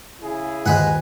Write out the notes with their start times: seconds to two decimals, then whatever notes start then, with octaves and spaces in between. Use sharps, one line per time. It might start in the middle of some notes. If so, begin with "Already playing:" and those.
0.22 C#3 E4 G#4
0.66 D#1 G#3 B4 F#5 G#5